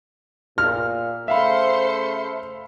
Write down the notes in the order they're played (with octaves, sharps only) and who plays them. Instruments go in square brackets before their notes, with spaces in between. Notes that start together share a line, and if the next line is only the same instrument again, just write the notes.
[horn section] A#2 [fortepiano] F6
[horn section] C#3 A3 [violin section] C5 C6 C#7 [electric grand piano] E5 F5 B5